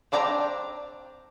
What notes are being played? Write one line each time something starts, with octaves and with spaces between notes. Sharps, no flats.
C4 D4 D5 G5 A#5